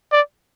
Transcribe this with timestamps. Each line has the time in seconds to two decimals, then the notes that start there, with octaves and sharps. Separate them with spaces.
0.12 D5